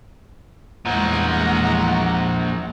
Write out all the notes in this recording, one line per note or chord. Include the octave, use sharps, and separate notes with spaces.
E2 A#2 F3 G3 G#3 F#5 A#5